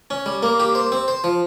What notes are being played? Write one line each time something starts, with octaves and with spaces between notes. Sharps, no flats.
C#4
G3
A#3
G4
C5
C4
C5
F3